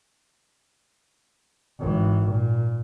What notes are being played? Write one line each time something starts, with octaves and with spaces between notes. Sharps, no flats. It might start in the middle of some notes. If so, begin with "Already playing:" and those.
G#1 E3
A#2